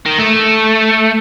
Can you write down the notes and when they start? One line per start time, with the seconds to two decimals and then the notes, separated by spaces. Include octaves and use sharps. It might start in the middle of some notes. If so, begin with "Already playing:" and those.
0.06 D#3
0.18 A3